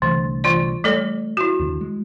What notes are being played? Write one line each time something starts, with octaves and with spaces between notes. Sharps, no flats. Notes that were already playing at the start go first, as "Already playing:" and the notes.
C2 D3 E3 A3
E3 F4 D5
G3 A3 A4 C#5
E4 F#4
D#2 D3
G#3